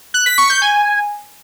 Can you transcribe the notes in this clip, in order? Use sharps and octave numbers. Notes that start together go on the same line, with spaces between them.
F#6
B6
C#6
G6
G#5